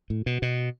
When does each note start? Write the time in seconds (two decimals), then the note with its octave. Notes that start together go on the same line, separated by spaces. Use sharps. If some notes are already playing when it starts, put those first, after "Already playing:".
0.10 A2
0.26 B2
0.42 B2